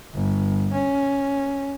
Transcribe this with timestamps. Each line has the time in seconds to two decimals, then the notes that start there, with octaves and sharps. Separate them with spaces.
0.14 G1
0.72 C#4